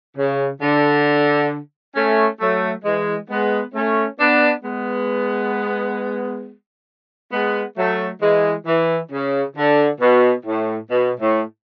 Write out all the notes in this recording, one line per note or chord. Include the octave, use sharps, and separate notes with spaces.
C#3
D3
A3 C#4
F#3 A3
E3 G#3
G#3 B3
A3 C#4
B3 D4
G#3 B3
G#3 B3
F#3 A3
E3 G#3
E3
C#3
D3
B2
A2
B2
A2